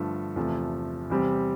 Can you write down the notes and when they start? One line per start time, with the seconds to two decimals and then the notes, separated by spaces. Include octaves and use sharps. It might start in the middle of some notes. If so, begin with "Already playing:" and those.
Already playing: G2 D3 F3 A3
0.36 E2 C3 F3 A3
1.10 E2 C3 G3 C4 G4